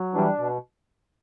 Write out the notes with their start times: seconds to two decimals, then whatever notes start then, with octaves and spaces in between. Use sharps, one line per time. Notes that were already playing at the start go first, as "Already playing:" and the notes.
Already playing: F#3
0.14 E3 G3 D4
0.38 B2